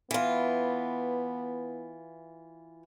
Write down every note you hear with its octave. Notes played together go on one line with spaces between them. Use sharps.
E3 B3 F4